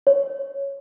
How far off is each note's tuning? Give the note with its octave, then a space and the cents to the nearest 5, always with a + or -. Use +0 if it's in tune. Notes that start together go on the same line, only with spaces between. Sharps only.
C#5 -5